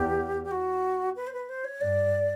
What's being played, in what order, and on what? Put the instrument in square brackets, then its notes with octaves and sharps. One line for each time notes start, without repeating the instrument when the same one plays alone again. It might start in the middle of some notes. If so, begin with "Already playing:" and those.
Already playing: [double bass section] E2 [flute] G4
[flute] G4
F#4
B4
C5
B4
C5
C#5
[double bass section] G2 [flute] D5